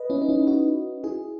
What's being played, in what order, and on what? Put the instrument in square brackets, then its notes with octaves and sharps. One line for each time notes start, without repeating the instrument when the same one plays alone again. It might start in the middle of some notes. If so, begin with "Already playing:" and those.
Already playing: [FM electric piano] B4 D#5
C#4 E4
D#4
C#4 E4
D#4 F#4
E4 G#4